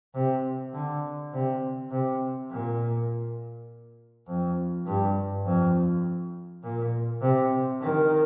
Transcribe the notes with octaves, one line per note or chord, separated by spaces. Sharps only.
C3
D3
C3
C3
A#2
F2
G2
F2
A#2
C3
D#3